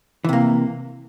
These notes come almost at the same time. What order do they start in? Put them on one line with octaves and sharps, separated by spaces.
E3 C3 A#3